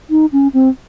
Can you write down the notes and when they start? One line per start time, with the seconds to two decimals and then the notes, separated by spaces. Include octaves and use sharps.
0.10 D#4
0.32 C#4
0.54 C4